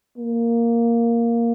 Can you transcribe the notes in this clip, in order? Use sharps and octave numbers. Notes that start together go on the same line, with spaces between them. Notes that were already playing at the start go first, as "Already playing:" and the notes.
A#3